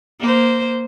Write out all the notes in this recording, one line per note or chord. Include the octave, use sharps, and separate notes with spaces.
A#3 C5